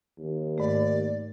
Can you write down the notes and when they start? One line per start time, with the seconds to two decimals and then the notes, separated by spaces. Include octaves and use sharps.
0.18 D#2
0.58 G#2 A3 D5